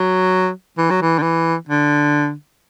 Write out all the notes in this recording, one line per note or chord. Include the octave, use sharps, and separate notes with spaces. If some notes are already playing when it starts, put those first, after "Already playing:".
Already playing: F#3
E3
F#3
E3
D3
E3
D3